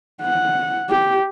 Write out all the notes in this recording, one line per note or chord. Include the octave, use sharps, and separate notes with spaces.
F#5
G4